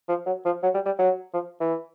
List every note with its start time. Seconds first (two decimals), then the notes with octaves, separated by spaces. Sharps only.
0.09 F3
0.26 F#3
0.45 F3
0.63 F#3
0.74 G3
0.86 G3
0.99 F#3
1.34 F3
1.61 E3